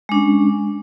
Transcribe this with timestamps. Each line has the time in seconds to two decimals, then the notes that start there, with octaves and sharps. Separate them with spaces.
0.09 G#3
0.12 D4
0.14 C#4